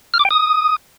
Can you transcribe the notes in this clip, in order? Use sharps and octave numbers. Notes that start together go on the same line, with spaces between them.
F6
D6
G5
D#6